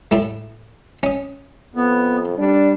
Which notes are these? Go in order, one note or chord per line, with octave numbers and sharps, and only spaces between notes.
A2 A3
C#4 D#6
F2 B3
G3 D4